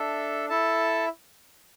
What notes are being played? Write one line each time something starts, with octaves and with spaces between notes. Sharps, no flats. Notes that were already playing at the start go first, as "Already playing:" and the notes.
Already playing: D4 A4 E5
E4 A4 E5 A5